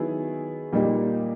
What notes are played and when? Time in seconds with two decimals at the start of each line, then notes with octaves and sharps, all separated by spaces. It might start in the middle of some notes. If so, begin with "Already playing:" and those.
Already playing: D#3 F#3 B3 E4 G#4
0.73 A#2 G3 A#3 D#4 G4